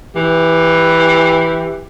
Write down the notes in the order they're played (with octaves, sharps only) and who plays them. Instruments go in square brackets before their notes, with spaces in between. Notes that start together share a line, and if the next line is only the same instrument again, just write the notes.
[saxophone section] E3 G4